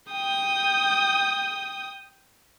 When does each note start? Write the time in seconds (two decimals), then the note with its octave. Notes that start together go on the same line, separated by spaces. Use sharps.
0.11 G5 D#6